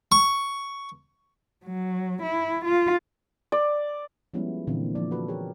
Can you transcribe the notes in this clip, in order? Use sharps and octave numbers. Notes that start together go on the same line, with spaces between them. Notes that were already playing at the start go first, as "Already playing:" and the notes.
C#6
F#3
E4
F4
D5
F3 G3 G#3 B3 C#4 E4
A#2 D3 E3 A#3 C4
F3 D5
F#4 A4 B4
G4 G#4 A#4 C#5